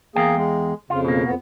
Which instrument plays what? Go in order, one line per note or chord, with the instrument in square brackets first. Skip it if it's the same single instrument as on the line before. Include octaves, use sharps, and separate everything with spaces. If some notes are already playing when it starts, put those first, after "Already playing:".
[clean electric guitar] E2 F5 G5 [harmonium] A#3 G#4
[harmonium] G#3
[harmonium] F2 C#3 [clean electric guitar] F4
[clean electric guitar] B2 A#3
[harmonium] F2 B3